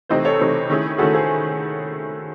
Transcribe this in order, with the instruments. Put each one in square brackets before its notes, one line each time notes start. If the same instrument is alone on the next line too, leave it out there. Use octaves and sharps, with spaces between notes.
[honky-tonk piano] C3 E3 A3 C4 D#4 [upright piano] C5 D#5
[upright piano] A4 C#5
[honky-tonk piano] C3 E3 A3 C4 D#4
D#3 A3 C#4 E4 G#4
[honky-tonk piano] D#3 A3 C#4 E4 G#4 [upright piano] F#4 A4
[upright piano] G#4 C5